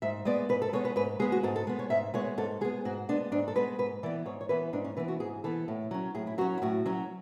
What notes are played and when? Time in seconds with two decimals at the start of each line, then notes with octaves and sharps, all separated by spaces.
0.02 G#2 E5
0.25 G#3 B3 D5
0.49 G#2 B4
0.62 A4
0.73 G#3 B3 C#5
0.85 B4
0.96 G#2 B4
1.20 G#3 B3 G#4
1.32 F#4
1.43 G#2 A4
1.56 A4
1.67 G#3 B3
1.79 C#5
1.90 G#2 E5
2.14 G#3 B3 C#5
2.38 G#2 A4
2.61 G#3 G#4
2.65 B3
2.85 G#2 F#4
3.09 G#3 B3 D4
3.32 G#2 D4
3.48 A4
3.55 G#3 B3 B4
3.79 G#2 B4
4.03 E3 D5
4.06 B3
4.26 G#2 C#5
4.41 C#5
4.49 E3 B3 B4
4.73 G#2 D4
4.84 C#4
4.97 E3 B3 B4
5.08 F#4
5.20 G#2 G#4
5.44 E3 B3 A4
5.68 A2
5.91 F#3 C#4
6.15 A2 G#4
6.27 E4
6.38 F#3 F#4
6.41 C#4
6.58 E4
6.62 A2 F#4
6.86 F#3 C#4